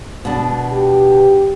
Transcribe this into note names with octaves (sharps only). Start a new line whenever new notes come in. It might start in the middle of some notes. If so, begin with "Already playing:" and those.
B2 D4
G4